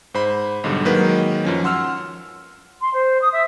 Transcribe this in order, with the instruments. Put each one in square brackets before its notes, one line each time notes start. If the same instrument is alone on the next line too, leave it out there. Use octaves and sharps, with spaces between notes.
[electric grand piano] G#2 C5 B5
B1 G#2 D3 G3
D#3 F#3 G#3 A#3 A#4 B4
F#2 F3 C#4
F#5 C6 E6 F6
[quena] C6
C5
D#6
E5